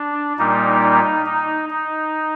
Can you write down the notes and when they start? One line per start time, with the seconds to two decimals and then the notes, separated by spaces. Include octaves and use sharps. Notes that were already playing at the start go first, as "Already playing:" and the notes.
Already playing: D4
0.38 A#2 G3 A#3 D#4
0.83 D#4
1.26 D#4
1.70 D#4